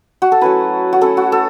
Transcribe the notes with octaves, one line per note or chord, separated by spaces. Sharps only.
F#4
A4
F#3 A3 C#4 E4 B4
F#4
A3 C#4 E4 A4
F#4
A4